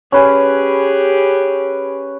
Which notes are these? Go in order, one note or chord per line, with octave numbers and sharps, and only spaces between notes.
C#4 G4 G#4 B4 G#5